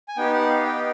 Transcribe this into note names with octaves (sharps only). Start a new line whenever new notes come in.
G#5
B3 D#4 G4 G5
F#5
F5
G5